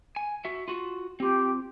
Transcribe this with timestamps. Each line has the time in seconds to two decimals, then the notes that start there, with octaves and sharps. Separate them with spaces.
0.16 G#5
0.45 F#4 E5
0.68 F4 F#4
1.20 C4 F4 G4